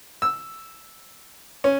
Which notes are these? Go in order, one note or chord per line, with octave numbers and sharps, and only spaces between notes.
E6
C#4